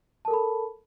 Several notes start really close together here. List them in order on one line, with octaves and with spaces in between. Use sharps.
A5 A#4 A4 B5